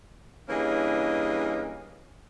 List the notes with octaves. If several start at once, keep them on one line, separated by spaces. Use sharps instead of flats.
G2 E3 A#3 C#4 G#4 D#5